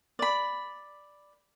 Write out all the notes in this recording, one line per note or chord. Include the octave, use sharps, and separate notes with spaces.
D5 B5